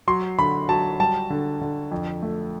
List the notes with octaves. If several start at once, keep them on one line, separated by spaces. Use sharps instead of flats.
F#3 C6
D3 B5
F#3 A5
G3 A5
D3
D3
F2
A3